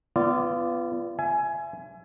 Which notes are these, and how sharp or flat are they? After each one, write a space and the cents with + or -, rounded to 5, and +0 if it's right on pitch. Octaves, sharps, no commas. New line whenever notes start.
B3 +20 F4 -30 D5 +0
E5 +35 G#5 +15